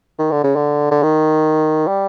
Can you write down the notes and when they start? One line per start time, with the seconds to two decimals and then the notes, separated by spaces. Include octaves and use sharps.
0.19 D#3
0.32 D3
0.44 C#3
0.56 D3
0.91 D3
1.03 D#3
1.88 G3